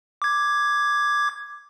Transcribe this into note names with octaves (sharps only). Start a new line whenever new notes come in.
D6 G#6